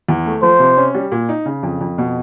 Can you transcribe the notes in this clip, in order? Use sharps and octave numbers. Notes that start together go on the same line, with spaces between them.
E2
A3
F3 C5
C3
C#4
G3
A#2
D#4
C#3
F2
F2
B2